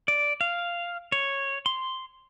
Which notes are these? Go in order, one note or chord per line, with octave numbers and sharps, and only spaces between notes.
D5
F5
C#5
C6